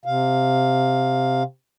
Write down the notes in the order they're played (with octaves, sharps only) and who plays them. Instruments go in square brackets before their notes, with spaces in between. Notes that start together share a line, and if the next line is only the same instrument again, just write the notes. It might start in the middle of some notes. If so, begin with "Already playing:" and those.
[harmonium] C3 F5